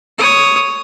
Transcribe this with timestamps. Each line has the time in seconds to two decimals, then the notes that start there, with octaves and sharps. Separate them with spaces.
0.18 C#5 D#6